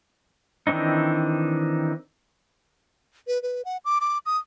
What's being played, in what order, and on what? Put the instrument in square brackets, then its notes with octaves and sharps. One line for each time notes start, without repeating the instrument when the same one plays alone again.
[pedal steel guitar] D#3 E3 C4 D4 D#4
[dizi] B4
B4
F#5
D6
D6
D#6